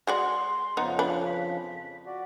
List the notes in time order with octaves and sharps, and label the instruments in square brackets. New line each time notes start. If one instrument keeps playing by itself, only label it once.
[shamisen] G#3 F#4 D5 [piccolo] C6
[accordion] F2 C#3 F3 [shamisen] B3 D#4
[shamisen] D4 B4
[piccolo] B6
[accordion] F#4 D5